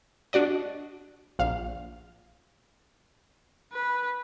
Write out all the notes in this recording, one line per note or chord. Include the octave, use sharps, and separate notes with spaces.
D4 F#4 D5 D#5
A#1 F5
B4